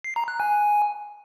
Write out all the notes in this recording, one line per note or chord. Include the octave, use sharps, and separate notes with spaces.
C7
A#5
F#6
G#5